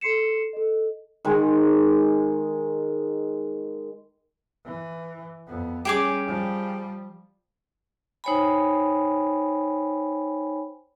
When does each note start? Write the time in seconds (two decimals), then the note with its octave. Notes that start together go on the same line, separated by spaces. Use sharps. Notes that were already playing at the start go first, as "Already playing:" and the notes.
0.01 A4 C6 C7 C#7 E7
0.53 A4 D#5
1.25 D#3 G#3
4.65 E3
5.47 F2 B3
5.85 G3 C#4 G4 G#4 D6
6.27 F3 G3
8.24 D#4 C5 C#5 G5 G#5 B5